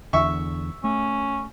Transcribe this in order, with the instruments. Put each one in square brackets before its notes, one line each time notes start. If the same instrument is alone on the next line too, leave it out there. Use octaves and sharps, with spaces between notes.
[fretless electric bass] E2 D3 [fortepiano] E5 C#6
[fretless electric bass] A3 [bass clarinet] C#4